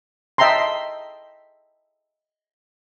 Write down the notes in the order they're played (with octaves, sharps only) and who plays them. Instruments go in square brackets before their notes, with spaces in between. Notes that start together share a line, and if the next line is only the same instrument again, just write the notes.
[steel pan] D#5 E5 G5 A5 A#5 C6